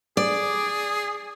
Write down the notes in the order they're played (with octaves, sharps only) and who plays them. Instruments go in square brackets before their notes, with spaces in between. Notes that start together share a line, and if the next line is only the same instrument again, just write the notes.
[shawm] G#4 [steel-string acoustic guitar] D5